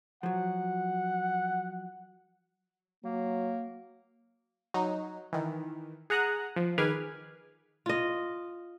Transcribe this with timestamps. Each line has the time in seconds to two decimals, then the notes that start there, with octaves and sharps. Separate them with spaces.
0.23 F3 F#3 F#5
3.04 F#3 A#3
4.74 F#3 D#4
5.33 D#3 E3
6.10 G#4 F#5 A#5 D#6 F#6
6.56 F3
6.78 D#3 G#4 B4 D6 F6 G#6
7.86 F4 D#5